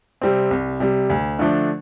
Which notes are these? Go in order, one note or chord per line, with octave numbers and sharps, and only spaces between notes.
C3 G3 C4
C2
C3 G3
D2
D3 F3 A3 D4